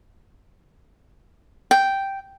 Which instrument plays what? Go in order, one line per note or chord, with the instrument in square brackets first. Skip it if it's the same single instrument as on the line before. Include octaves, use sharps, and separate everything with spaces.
[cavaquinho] G5